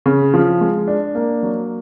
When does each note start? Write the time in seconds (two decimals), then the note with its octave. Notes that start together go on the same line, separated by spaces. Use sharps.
0.06 C#3
0.34 F3
0.61 G#3
0.88 D4
1.15 A#3
1.43 F#3